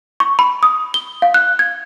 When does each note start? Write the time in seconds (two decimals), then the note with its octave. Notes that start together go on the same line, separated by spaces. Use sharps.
0.20 C#6
0.39 B5
0.63 D#6
0.94 G7
1.22 F5
1.34 F#6
1.59 G#6